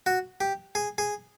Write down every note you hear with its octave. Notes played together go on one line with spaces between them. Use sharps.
F#4
G4
G#4
G#4